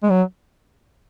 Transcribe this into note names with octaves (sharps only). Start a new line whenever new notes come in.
G#3
F#3